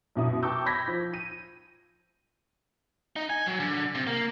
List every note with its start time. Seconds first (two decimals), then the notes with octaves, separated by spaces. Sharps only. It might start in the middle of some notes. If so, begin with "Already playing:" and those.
0.16 F#2 B2 E4 D#6
0.43 G5 A5 C#6 D6 E6 G6
0.66 B5 G6 G#6 A#6 B6
0.88 F3
1.14 D#7
3.16 D#4
3.30 G#5
3.46 F#3
3.60 D3
3.95 C3
4.07 A#3